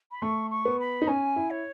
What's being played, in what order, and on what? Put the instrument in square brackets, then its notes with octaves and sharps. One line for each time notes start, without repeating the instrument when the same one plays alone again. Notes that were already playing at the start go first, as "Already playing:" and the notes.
[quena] B5
[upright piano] A3 [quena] C#6
[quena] C#6
[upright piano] B3
[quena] B5
[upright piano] D#4
[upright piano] C#4 [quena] G#5
[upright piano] E4
[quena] C#5